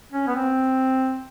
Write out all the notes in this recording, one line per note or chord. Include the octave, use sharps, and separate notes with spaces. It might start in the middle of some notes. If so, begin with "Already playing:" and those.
C#4
B3
C4